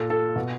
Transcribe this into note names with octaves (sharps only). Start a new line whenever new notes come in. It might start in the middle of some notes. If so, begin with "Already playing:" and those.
Already playing: A#2 A4
A4
B2